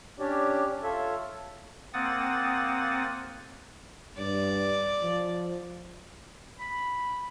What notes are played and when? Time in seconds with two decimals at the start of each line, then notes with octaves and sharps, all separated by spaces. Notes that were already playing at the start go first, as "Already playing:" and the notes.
0.19 C#4 D4 G4 C#5 D5
0.83 F4 A4 C#5 E5
1.93 A#3 C4 F#5 D#6 A6
4.18 G2 D5
5.03 F3
6.59 B5